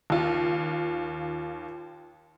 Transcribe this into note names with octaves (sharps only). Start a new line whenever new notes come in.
D#2 F4